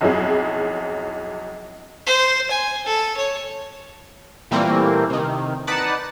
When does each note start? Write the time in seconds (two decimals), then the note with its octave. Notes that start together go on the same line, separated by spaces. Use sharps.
0.01 B1 F2 F#3 E4 G#4
2.06 C5
2.51 G#5
2.86 A4
3.17 C#5
4.51 A#2 E3 G3 A3 A#3 C4
5.10 C3 D#3
5.67 D#4 B4 D5 F#5 A5